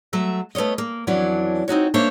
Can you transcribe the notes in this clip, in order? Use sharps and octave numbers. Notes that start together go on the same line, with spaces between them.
F#3 A3 E5
A3 B3 F4 C#5 D#5
A#3
F2 E3 F#3 C#4 D4
C4 D#4 F#4 C#5
A#3 D4 C5 C#5 E5 F5